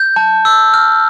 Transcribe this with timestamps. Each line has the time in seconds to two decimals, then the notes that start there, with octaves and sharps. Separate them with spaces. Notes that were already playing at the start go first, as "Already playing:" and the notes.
Already playing: G6
0.16 A5
0.45 E6
0.74 F6